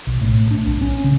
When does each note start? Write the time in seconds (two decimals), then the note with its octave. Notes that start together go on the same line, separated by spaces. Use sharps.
0.07 B1
0.21 A2
0.51 D4
0.67 B1
0.81 C#4
1.04 C#3